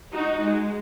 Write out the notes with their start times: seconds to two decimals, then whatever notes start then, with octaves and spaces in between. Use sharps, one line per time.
0.12 D#4 F#4
0.42 G#3